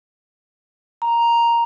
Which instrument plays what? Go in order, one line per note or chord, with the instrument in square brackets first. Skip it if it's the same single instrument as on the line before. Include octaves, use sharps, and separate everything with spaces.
[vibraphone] A#5